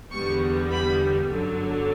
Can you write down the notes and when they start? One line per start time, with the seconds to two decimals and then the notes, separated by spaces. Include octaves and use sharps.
0.12 E2 D3 G3 B3 C#6
0.71 B5
1.29 G1 F#2 D3 F#3